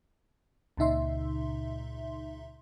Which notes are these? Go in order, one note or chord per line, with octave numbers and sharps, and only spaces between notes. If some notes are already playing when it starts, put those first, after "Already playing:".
C#2 A#2 C#3 D#4 E5 C6